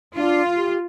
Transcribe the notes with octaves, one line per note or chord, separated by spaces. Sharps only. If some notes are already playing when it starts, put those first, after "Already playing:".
D4 F4
G4